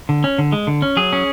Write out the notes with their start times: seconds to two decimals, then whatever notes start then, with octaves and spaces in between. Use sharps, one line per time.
0.09 D3
0.24 C#4
0.38 D3
0.52 G#3
0.67 D3
0.82 C#4
0.97 F#3 G#4
1.13 C#4